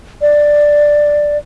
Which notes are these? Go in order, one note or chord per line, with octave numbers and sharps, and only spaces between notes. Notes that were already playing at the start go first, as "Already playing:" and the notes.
D5